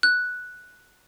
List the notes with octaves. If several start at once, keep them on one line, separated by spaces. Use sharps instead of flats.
F#6